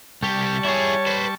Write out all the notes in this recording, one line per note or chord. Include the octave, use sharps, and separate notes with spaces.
C2 G3 G4 A5 C#6
E4 G#4 C#5
B4 C5